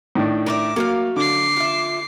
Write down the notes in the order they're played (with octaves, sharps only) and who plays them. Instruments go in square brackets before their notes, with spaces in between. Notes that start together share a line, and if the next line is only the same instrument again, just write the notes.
[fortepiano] A2 D#3 D4
[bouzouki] A#4 B4 E5 [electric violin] D6
[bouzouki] F#3 A3 F5 [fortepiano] A#3
[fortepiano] D3 [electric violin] D6 C7
[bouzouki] F4 E5